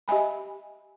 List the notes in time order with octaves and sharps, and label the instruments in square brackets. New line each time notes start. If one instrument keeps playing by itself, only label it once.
[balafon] G4 D#5 E5 G#5 B5